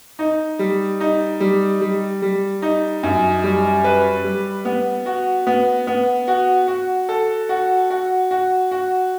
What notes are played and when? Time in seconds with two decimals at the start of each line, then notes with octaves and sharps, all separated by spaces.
0.19 D#4
0.59 G3
1.00 D#4
1.40 G3
1.81 G3
2.22 G3
2.62 D#4
3.03 F#2
3.44 G3
3.84 B4
4.24 G3
4.65 B3
5.06 F#4
5.47 B3
5.87 B3
6.28 F#4
6.68 F#4
7.09 A4
7.49 F#4
7.90 F#4
8.31 F#4
8.71 F#4